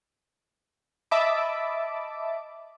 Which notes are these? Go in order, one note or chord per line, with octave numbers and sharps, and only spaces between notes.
D#5 E5 A5 B5 D6